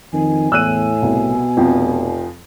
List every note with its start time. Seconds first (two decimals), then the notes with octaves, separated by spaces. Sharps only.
0.13 F2 D#3 G#5
0.52 E2 A2 E6 F#6 D#7
1.02 C2 B2
1.57 F1 F2 F3 G5